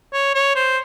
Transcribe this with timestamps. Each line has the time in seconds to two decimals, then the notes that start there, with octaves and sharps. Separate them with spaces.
0.13 C#5
0.35 C#5
0.56 C5